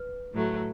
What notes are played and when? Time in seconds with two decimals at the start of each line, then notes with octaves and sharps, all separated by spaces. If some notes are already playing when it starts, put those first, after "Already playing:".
Already playing: B4
0.33 A2 F#3 A3